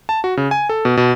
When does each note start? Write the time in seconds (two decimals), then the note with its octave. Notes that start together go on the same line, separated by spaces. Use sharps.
0.09 A5
0.24 F#4
0.37 C#3
0.51 G#5
0.69 A4
0.85 B2
0.97 B2